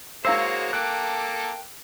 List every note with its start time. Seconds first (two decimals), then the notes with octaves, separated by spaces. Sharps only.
0.25 G#3 A#3 E4 F#4 C5 C#5 F5 E6
0.73 A#3 A4 G5 D6 F#6